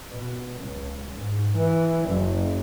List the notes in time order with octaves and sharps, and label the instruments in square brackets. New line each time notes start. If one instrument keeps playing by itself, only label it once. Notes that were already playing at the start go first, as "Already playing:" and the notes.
[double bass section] B2
C#2
G#2
E3
F#1